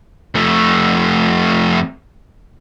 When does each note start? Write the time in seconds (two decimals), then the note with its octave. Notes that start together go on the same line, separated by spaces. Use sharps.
0.35 F2 A3